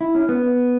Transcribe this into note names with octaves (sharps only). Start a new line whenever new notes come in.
E4
C#4
B3